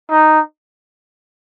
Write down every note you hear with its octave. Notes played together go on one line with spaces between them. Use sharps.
D#4